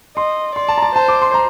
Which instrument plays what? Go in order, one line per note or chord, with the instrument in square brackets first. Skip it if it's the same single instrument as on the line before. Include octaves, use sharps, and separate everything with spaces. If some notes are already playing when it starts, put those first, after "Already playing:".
[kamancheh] D#5 [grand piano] C6
[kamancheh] D5 [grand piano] C6
[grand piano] A5
A#5
A5
[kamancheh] C5 [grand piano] A5
[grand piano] D6
C6
A#5